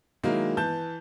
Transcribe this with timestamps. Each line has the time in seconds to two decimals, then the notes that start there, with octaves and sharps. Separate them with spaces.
0.23 D#3 F#3 G#3 A#3 E4
0.57 E3 A5 G6